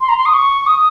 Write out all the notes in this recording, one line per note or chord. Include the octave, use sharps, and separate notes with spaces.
C6
A#5
C6
D#6
C#6
D#6